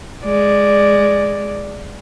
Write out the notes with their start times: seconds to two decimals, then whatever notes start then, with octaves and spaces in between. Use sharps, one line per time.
0.24 G#3 D5